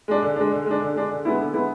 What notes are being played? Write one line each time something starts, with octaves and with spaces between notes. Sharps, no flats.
G#3 D4
D3
G#3 D4
D3
G#3 D4
D3
G#3 D4
D3
G#3 B3 E4
D3
G#3 B3 E4